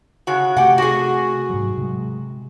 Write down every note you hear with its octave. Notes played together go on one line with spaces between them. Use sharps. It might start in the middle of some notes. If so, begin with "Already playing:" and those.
C#3 F#4
C3 A3 G4 F#5
F#4 G#4
G#2 F#3
C3 G#3